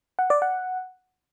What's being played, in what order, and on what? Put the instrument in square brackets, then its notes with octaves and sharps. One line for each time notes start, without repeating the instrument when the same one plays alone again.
[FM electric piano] F#5
D5
F#5